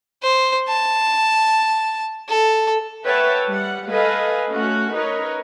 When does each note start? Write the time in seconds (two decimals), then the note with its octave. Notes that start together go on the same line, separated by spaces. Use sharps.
0.23 C5
0.69 A5
2.29 A4
3.04 B4 C#5 E5 F#5 G5 A5
3.46 G3 F#5
3.89 A4 B4 D#5 F5 G#5
4.50 A3 C#4 F#4 F#5
4.93 D#4 A#4 B4 C#5 D#5